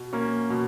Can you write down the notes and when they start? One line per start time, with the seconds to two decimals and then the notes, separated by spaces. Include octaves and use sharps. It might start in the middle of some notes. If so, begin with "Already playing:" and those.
Already playing: B2
0.13 A#3 C#4
0.50 B2